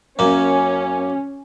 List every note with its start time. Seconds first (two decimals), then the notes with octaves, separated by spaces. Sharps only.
0.19 F#2 A#3 C#4